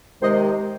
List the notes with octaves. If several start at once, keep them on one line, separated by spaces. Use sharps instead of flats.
C3 D#3 G#3 C5 D#5